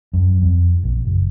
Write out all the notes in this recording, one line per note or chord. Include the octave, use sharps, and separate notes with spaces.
F#2
F2
A#1
F#1